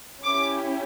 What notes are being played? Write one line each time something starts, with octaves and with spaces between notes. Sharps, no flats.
C#4 E4 G4 D6